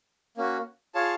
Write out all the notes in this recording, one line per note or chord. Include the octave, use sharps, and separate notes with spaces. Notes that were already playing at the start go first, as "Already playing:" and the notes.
A#3 C#4 F#4
F4 G#4 C#5 F5 A5